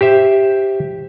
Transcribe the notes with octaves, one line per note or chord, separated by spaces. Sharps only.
G4 C5 E5